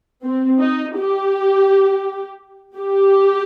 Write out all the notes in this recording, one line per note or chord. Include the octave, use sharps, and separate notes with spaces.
C4
D#4
G4
G4